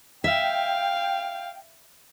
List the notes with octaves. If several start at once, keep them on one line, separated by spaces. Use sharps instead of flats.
E5 F5 G5